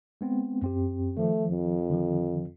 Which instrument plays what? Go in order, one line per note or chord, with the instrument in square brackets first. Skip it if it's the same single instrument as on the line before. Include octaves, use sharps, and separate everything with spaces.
[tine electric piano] G#3 B3 C4
F#2 C4 G4
[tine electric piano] D#3 F3 [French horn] A3
[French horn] F2
[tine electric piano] D3 D#3 F3